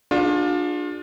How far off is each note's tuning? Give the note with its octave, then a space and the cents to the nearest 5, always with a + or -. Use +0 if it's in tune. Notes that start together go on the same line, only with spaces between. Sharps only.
D4 +10 F4 +35 G#4 +0